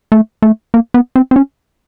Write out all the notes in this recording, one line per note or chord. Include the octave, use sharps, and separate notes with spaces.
A3
A3
A#3
B3
C4
C4
C#4